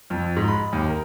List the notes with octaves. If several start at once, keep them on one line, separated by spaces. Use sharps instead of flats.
F2
G#2
B5
D#2
A#4